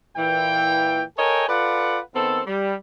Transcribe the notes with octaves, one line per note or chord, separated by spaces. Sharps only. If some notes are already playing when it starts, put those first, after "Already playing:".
A#2 E3 G5
A4 A#4 C#5 D#5 G5 G#5
F4 A4 B4 D5 F#5
D#3 B3 C4 A4
G3